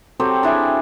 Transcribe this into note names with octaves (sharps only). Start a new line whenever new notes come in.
F#3 C4 G4 A4
D4 E4 G#4 G#5